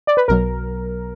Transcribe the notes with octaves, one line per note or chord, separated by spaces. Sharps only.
D5
B4
B1 B2 F#3 A#4